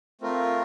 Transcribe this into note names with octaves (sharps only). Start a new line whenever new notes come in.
A3 C4 F4 A#4